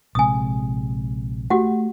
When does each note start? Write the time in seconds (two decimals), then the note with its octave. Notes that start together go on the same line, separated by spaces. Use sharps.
0.15 A#1 C3 G#3 G#5 D#6
1.50 A3 F#4 G4 F#5